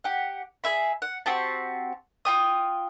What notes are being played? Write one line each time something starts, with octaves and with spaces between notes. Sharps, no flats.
G4 F#5
G#4 E5 B5
F#5
C4 F#4 G4 A5
F4 G5 D#6